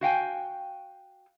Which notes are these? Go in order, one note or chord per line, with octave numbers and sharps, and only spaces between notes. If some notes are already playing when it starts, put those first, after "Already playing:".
F#4 F5 G5 G#5